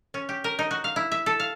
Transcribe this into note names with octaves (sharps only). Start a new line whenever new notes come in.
C#4
G4
A#4
D#4
F#4
F5
E4
E5
A4
F5